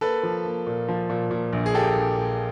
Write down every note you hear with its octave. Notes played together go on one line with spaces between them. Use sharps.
A#3 A4 B4
F3
A#3
A#2
F3
A#2
A#2
A#1
G#4
A#3 G4 A4
A#1
A#2